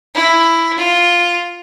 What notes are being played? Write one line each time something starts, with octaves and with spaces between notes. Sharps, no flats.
E4
F4